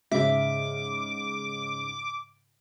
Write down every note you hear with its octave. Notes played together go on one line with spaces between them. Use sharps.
G#2 C#3 E5 D6